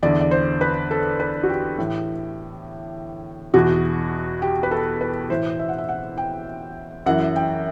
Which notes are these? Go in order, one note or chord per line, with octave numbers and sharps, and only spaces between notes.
E2 D3 D5
D5
C5
B4
A4
B4
F#4
G4
A2 E3
E2 B2 F#4
G4
B4
A4
B4
A2 E3 C5
E5
F#5
E5
F#5
G5
F#2 E3 F#5
G5